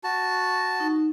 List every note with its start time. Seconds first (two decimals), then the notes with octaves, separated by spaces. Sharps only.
0.04 F#4 A5
0.80 D#4